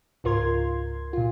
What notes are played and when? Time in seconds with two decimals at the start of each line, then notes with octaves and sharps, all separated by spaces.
0.24 C#2 G#2 F4 A#4 C6 G#6
1.13 A#2 F4